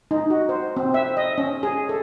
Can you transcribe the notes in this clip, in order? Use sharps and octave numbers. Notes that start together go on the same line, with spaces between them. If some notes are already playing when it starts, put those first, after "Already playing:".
D#4
F#4
C5
C4
E5
D#5
C#4
G#4
A4